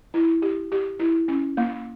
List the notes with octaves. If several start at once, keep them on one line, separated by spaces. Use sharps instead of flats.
E4
G4
G4
E4
C#4
A#3